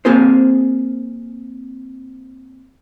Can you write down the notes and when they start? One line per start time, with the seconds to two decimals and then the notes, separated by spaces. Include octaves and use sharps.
0.05 A#3 C4 F4 G#4 A#4 C5